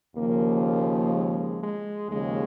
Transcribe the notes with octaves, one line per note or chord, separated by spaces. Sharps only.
D#2 C#3 F3 A#3
A#3
G#3
G#3
D#2 C#3 F3 G#3